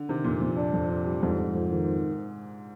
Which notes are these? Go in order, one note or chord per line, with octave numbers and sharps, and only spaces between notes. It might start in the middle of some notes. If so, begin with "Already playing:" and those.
Already playing: D3
C3 D#3
F2 A#2
F2 A#2
D4
F2
D4
G3
F2 G#2
F2
F2
D#3